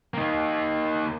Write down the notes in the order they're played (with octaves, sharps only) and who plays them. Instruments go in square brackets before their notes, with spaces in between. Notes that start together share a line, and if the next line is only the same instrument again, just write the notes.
[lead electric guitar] A#3 D#4